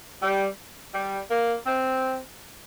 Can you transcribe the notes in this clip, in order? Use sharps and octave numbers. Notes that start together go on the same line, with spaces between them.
G3
G3
A#3
C4